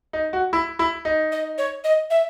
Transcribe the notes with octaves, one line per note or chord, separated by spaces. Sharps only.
D#4
F#4
E4
E4
D#4
D#5
C#5
D#5
E5